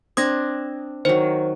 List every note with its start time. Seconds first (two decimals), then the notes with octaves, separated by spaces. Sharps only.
0.17 C4 D4 D#6 G#6 A#6
1.05 D#3 F#3 C5